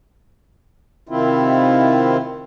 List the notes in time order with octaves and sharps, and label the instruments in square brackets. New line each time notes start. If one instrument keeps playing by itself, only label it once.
[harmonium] C3 D#3 C4 E4 F4